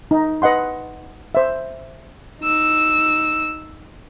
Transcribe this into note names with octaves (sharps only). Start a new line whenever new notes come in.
D#4
B4 D#5 F#5 C6
C5 E5
D#4 E6